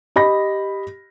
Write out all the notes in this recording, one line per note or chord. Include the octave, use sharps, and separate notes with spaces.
G4 D#5 B5 A#6